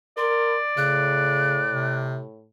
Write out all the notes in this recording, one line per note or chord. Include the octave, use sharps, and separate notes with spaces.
A#4 D5 C6
A2 C#3 F#6
C3